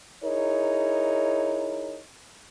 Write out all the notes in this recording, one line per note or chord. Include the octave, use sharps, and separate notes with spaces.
D#4 E4 G#4 A#4 C#5